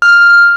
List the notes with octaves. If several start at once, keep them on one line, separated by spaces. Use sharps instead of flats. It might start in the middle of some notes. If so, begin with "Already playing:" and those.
F6